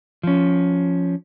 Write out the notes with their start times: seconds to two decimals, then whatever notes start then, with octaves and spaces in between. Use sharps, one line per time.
0.23 F3 C#4